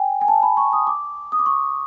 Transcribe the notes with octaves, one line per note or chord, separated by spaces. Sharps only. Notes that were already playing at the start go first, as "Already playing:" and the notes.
Already playing: G5 G#5
G#5
A5
B5
C#6
D#6
D6
D#6
D6
C#6